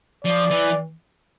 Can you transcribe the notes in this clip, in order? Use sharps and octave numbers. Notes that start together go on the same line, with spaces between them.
F3 D5
E3